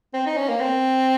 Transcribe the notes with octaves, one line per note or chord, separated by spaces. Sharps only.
C4
D#4
C#4
A#3
C4